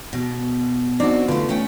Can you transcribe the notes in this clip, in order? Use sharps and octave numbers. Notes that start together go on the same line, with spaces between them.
B2
C4 D4 D#4 F#4 D5
D3 A3 F4 B4
A3 C#4 G5